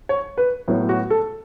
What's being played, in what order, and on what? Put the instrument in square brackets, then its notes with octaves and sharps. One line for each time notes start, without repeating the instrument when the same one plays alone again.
[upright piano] C#5
B4
A2 F#3 B3
F#4
A4